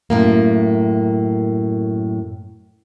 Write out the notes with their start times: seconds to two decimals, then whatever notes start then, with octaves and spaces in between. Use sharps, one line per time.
0.10 F#2 A2 A#3